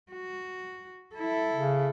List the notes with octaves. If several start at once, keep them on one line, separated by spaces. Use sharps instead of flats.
F#4
E4 A4
C#3